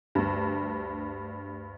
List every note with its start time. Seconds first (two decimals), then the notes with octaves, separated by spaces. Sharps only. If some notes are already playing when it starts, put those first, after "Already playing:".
0.15 D2 G2